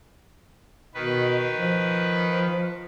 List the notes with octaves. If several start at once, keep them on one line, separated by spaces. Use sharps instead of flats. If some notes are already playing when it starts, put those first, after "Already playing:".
B2 D#3 B4
F3